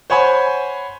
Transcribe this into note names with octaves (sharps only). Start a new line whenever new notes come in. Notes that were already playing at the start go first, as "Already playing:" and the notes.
C5 C#5 F#5 G#5 B5 C6